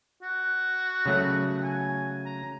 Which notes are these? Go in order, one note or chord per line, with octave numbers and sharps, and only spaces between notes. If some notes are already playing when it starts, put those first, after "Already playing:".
F#4
C#3 F#3 A3
G#5
A#5